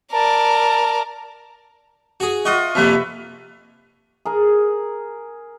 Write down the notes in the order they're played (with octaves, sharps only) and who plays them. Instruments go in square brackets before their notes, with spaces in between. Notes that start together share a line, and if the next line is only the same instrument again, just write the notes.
[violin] A#4 D5 [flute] A5
[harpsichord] F#4 G#4
[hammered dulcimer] F4 F#4 [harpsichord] D#5 E5
[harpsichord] F2 C3 A#3 [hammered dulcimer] B4 E5
[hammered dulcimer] G#4 A#4